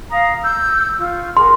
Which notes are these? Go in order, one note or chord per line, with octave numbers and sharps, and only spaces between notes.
F5 A#5 D#6
E6 G6
F4 C#6
F#4 G#4 A#4 C6